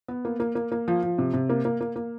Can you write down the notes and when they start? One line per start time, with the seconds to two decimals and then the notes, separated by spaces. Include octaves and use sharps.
0.08 B3
0.25 A#3
0.40 A#3
0.55 A#3
0.72 A#3
0.88 F3
1.03 F3
1.18 C3
1.34 C3
1.50 A#3
1.65 A#3
1.81 A#3
1.96 A#3